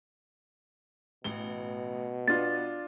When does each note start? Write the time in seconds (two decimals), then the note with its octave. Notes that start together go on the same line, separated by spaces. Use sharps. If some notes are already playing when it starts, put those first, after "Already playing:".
1.24 A1 B2 G7
2.28 B3 D4 F4 A6